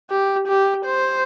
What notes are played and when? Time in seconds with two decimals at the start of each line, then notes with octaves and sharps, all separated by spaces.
0.10 G4
0.48 G4
0.86 C5